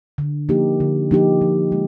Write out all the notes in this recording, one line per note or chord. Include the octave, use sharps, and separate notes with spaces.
D3
F3 A#3 D#4 G4
D3
F3 A#3 D#4 G4
F3
G#3